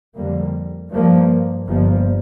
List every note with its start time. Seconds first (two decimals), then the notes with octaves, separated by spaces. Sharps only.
0.16 F2 D3 G3 A#3
0.91 G2 F3 A#3
1.67 G1 G2 F3 A#3